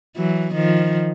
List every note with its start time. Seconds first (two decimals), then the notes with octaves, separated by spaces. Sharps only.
0.16 E3 F#3
0.54 D#3 F3